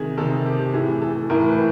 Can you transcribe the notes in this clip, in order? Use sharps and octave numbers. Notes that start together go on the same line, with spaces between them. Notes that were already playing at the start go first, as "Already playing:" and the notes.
Already playing: C3 D#3 G#4
C3 D#3 A4
G4
A2 E3 G#4
A4
A2 E3 A#4
B4